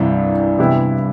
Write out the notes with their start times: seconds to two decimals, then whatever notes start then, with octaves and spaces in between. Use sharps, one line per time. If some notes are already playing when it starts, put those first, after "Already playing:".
Already playing: C2 G2 C3 E3 D4
0.59 C3 E3 B3 E4 G4